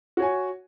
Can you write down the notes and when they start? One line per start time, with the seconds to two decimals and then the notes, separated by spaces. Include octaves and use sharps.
0.17 F#4
0.20 C#5
0.22 G#5